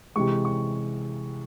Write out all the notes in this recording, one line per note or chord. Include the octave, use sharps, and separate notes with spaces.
C3 E3 G#3 C#6
C#6